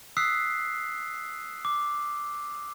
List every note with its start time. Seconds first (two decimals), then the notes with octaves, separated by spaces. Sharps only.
0.17 D#6 E6 F#6 B6 C7
1.65 D6